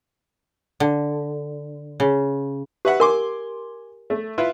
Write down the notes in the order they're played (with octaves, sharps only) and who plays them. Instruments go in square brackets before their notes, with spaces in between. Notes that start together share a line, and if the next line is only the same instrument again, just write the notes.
[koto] D3
C#3
[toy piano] G4 [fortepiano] B4 E5 F#5
[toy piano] A#4 [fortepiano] G#5 C6 D6
[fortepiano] A3
E4 F4 B4